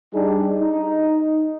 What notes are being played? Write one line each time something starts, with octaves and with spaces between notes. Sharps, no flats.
G3 D4 D#4 G4 G#4
D#4